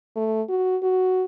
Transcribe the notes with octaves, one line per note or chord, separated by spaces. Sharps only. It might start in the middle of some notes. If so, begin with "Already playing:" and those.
A3
F#4
F#4